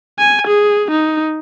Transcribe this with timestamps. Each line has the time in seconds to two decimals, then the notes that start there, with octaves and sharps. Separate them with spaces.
0.19 G#5
0.47 G#4
0.91 D#4